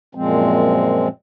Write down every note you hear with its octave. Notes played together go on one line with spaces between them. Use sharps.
F#2 A#2 F3 G#3 C4